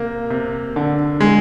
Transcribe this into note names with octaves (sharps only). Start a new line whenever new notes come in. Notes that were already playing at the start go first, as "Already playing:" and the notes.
Already playing: C3 A#3
C3
D3
G#3